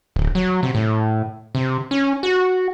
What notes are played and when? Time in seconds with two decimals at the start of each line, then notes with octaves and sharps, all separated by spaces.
0.16 D1
0.35 F#3
0.63 C3
0.75 A2
1.55 C3
1.91 C#4
2.23 F#4